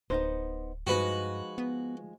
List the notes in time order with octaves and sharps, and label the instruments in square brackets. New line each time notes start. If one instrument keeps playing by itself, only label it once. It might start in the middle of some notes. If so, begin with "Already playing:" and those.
[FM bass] D1 [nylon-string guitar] B3 D#4 C5
[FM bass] G2 [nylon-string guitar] F3 G#3 D#4 [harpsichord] F#4 B4
[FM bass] B3